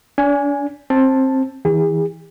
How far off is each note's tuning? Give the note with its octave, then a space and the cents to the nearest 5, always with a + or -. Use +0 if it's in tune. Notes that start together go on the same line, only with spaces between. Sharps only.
D4 -35 G#5 +0
C4 +20 A5 +0
E3 -35 G#4 -40